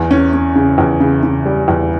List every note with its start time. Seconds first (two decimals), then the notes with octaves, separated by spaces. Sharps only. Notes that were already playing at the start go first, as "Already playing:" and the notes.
Already playing: E2
0.11 C#4
0.33 C#4
0.56 C#3
0.78 E2
1.00 C#3
1.23 C#3
1.46 G3
1.68 E2